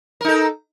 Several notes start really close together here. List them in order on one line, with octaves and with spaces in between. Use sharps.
A#4 D#4 A4